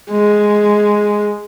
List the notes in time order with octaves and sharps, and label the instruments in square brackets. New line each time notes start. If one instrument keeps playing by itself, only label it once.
[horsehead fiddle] G#3